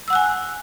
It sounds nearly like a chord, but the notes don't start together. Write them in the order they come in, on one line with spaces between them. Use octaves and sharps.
E6 F#5 F#6 G#5